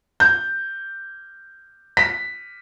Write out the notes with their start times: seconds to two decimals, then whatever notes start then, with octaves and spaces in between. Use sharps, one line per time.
0.20 G6
1.97 B6